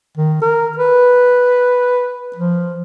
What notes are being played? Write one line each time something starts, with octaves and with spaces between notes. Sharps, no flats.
D#3
A#4
B4
F3